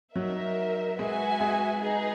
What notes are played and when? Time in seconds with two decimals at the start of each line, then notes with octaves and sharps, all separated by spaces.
0.16 F#3 D#4 A#4 E5
0.99 G#3 F#4 B4 E5 G#5
1.40 G#3
1.82 D#4 G#4 B4